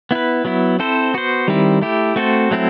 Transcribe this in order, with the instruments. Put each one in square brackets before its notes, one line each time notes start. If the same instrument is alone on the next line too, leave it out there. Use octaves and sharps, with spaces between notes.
[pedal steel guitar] B3 E4 B4
F#3 B3 E4
C4 E4 A4 C5
B3 F#4 C5
D#3 G3 C4 E4
A3 E4 G4
A3 C4 F#4 A4 C5
F#3 A3 C4 E4